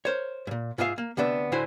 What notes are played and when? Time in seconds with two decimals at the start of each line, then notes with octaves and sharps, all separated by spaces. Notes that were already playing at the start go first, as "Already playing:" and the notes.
0.05 A#4 C5 C#5
0.47 G2 A#2
0.78 G#2 F4 G#4 E5 F5
0.98 A#3
1.17 D2 C3 B3 D4 D5 E5
1.52 A2 D3 E4 F#4 C5 G#5